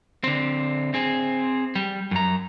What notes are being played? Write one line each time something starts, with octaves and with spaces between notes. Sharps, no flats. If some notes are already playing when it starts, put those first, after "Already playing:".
D3 C4
C4 G#4
G3
F#2 A#5